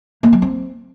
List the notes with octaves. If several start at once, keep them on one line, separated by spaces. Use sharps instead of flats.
A#3
F#3
C4